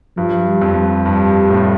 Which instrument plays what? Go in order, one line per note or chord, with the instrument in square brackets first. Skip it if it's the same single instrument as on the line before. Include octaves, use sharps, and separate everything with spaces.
[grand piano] G2 [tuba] F3
[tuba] G3
[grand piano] F2
[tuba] G3
[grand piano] G2
A2